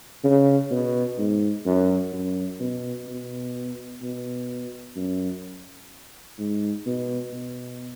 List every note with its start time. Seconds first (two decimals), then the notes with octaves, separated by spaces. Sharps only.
0.24 C#3
0.71 B2
1.18 G#2
1.66 F#2
2.13 F#2
2.60 B2
3.08 B2
4.02 B2
4.96 F#2
6.39 G#2
6.86 B2
7.33 B2